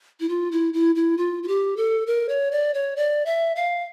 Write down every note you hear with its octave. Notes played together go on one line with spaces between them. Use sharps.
E4
F4
E4
E4
E4
F4
F4
G4
A4
A#4
C#5
D5
C#5
D5
E5
F5